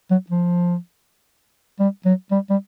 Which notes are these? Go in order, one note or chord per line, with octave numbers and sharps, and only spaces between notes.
F#3
F3
G3
F#3
G3
G3